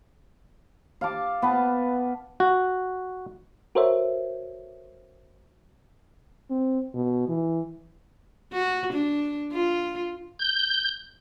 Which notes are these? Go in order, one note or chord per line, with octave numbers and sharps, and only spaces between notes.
F5 A5 D6
B3 B4 A5
F#4
F#4 A4 A#4 C5 C#5 E5
C4
B2
E3
F#4
D4
F4
G6